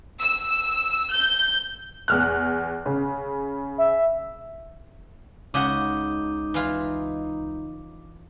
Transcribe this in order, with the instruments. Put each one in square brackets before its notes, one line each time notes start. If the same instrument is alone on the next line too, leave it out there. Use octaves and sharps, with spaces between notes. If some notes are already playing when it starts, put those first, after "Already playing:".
[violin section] E6
G6
[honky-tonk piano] E2 F6 F#6
C#3
[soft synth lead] E5
[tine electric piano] C#2 D#6 G6 [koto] C#3 F#4 [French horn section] D#4 [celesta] D6
[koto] E3 F4